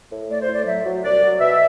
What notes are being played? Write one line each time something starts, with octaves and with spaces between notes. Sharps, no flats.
A2
A3 D5
C5
A2
D5
F#3 E5
F#3
C2 D5
F#3
B2 E5